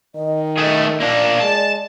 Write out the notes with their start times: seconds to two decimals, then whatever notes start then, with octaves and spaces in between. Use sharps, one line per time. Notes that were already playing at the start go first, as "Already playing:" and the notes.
0.15 D#3 D#5
0.58 A3 G#4
1.01 A#2 A#3 D4 D5
1.40 G#3 A5